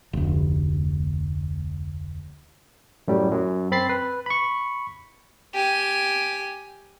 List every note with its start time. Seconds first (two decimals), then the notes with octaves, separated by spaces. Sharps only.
0.13 F1 D2
3.08 F#2 A2 G3
3.31 F#2
3.72 C4 B5 A6 C7
3.89 B4
4.26 B5 C#6
5.54 G4 G#5